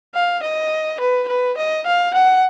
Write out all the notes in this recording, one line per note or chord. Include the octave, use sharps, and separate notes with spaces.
F5
D#5
B4
B4
D#5
F5
F#5